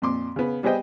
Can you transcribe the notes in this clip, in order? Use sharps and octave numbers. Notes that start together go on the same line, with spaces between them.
F2 A#2 C6 D6
C#3 B3
G3 B3 G#4 C5 D#5 G5